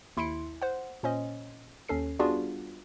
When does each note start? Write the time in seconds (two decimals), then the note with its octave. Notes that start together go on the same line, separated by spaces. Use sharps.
0.17 D#2 E4 B5 C6 C#7 D7
0.62 C5 F#5
1.03 A#2 C#4 C5 D#5
1.89 D#2 C#4 A4 C7
2.19 G3 B3 D4 F4 F#4 G#4